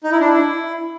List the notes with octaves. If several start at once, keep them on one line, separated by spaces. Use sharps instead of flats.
D#4
E4
D4
E4